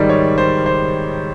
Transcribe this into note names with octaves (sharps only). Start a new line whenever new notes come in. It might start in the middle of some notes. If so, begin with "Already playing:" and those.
Already playing: G#2 D#3 G3 D5
C#5
C5
C5